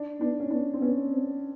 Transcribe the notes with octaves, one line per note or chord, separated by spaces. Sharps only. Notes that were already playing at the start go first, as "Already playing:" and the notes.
Already playing: D4
B3 D4
C#4
B3 D4
C4
B3 C#4
C4